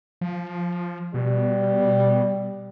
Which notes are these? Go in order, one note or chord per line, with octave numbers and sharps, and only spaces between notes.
F3
B2 G3